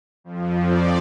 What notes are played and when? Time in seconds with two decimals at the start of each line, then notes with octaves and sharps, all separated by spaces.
0.24 F2 F3
0.67 D5